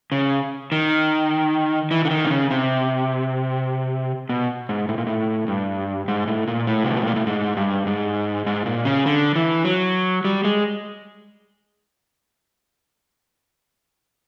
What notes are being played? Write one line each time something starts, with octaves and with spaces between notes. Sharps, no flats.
C#3
D#3
E3
D3
D#3
C3
C#3
C3
B2
G#2
A2
A#2
A2
G2
G#2
A2
A#2
A2
C3
B2
A#2
A2
G#2
G2
G#2
G#2
A#2
C#3
D3
E3
F#3
G3
G#3